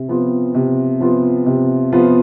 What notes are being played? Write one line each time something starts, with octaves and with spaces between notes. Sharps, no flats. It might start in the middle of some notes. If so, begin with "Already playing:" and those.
Already playing: C3
F3 B3 F4
C3
F3 B3 F4
C3
F3 B3 F4